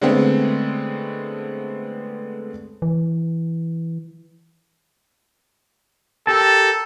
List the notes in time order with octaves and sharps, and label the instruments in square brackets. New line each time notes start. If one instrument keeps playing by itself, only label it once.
[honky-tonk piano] D3 G#3 A3 B3 C4
[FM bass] E3
[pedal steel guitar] G4 A#4 A5 [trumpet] A4